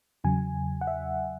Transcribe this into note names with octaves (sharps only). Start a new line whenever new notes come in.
E2 C#3 F#3 G#5
F#5
E5